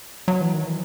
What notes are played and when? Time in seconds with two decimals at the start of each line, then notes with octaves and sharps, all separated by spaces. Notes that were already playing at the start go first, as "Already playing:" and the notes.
0.28 F#3
0.41 E3
0.54 D#3
0.66 E3